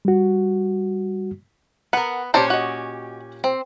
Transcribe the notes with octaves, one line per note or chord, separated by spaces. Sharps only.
G3 F#4
B3 A#4 F#5
A#2 C#4 G4 C5 D5 A5
F#4 D#5
C4